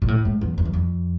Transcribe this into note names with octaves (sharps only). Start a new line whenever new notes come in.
A#2
A2
G#2
E2
F2
E2
F2